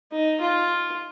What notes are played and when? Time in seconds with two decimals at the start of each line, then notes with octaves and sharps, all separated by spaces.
0.12 D#4
0.41 F4